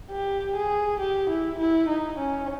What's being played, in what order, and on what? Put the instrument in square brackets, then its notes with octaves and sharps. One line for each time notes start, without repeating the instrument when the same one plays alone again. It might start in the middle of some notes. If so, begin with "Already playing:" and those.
[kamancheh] G4
G#4
G4
E4
E4
D#4
C#4